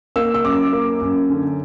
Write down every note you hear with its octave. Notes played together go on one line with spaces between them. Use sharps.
A#3 E6
E6
F#2 D6
A#3
F#2
D3